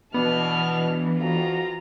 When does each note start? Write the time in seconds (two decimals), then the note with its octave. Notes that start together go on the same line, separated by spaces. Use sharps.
0.14 B2 E3 B3 D4 A5 F6
1.18 F2 F4 F#4 A#5